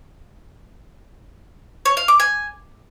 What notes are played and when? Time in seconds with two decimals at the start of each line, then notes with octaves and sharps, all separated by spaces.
1.85 C#5
1.97 F5
2.08 D6
2.20 G#5